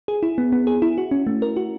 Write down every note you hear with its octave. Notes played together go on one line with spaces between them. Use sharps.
G#4
E4
B3
B3
G#4
E4
F#4
C#4
A3
A#4
F#4